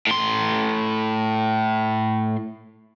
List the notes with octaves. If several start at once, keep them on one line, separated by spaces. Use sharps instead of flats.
A2 C6